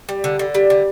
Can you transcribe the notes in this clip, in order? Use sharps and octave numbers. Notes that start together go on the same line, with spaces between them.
G3
D3
D3
G3
D3